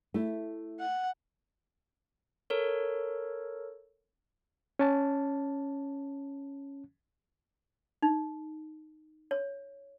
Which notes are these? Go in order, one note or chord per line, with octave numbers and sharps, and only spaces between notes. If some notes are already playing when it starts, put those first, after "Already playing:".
A3 E4
F#5
A4 A#4 C#5
C#4 A5
D#4
C#5